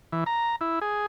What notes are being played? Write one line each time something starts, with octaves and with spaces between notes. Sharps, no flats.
E3
A#5
E4
G#4